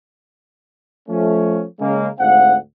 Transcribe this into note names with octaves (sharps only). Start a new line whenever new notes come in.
F3 A3 C#4
C#3 G#3 A#3
D2 G#2 C4 F5 F#5